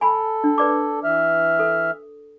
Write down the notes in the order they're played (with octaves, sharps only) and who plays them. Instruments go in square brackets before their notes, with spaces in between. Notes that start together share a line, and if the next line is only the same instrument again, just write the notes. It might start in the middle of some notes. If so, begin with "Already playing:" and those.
[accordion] A4 [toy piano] G#5 B5
[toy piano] D4
B4 D5 D6
[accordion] E3 E5 F6
[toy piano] A4